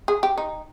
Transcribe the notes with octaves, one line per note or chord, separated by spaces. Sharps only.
G#4
G4
D#4